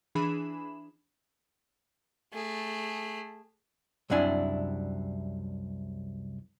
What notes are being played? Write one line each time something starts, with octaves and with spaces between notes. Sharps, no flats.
E3 D4 G#4 B5 E7
A3 G#4
C2 F#2 C3 D4 E4 G#5